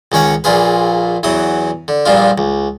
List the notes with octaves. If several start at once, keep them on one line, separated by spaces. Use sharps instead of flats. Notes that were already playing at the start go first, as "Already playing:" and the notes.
C#2 D#3 C#4 C#5 F#5
A#1 A#2 F4 G#4 B4
E2 E3 F#3 D#6
D3
A#1 G2 A#2 F3 D4 F4
C#2